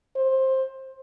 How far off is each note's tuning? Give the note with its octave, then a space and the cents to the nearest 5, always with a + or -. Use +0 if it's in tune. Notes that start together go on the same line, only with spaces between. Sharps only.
C5 +15